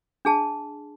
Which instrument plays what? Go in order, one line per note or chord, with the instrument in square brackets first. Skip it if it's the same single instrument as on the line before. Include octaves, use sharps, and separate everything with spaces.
[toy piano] D4 G#4 A5